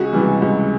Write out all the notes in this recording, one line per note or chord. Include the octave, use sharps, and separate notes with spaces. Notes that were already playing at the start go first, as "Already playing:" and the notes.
Already playing: C#2 F#4 G#4
C3 E3 G3
C#2